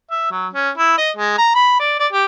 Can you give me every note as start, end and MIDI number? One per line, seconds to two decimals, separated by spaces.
0.10 0.30 76
0.31 0.48 54
0.53 0.70 61
0.77 0.95 64
0.98 1.10 75
1.16 1.35 56
1.38 1.51 82
1.55 1.77 83
1.79 1.98 74
1.99 2.07 74
2.12 2.25 67